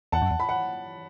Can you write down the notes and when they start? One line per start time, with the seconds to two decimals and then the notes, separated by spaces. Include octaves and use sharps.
0.12 E2 F#5 A5
0.22 F#2
0.31 E2
0.40 B5
0.49 F#5